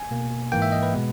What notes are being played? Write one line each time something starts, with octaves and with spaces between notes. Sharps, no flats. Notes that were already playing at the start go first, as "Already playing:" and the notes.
Already playing: G#5
B2 A#3
G#2 E3 A#3 G5
E5
D#5
B4
B2 G#3 B3